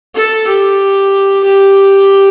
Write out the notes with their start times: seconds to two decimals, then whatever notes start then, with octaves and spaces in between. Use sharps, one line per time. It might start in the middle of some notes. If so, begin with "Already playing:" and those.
0.15 A4
0.48 G4
1.45 G4